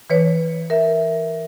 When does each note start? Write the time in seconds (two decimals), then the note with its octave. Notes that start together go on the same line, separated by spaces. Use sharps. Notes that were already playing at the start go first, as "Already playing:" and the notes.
0.10 E3 B4 C#5
0.70 A#4 E5